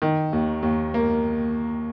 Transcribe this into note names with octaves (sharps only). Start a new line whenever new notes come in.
D#3
D#2
D#2
A#3